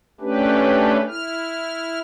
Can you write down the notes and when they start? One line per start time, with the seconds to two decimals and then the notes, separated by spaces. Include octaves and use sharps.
0.21 A3 C#4 D4 G4 B4
1.08 E4 F6